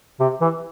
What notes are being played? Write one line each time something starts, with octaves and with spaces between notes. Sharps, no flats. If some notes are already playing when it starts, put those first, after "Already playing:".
C3
E3